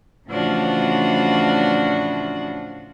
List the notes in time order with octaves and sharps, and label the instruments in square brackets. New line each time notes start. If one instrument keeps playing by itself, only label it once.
[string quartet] A2 C#3 E3 F3 D4 F#4